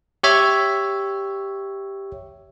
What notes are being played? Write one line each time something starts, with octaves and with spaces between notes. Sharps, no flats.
G4 C#5 E5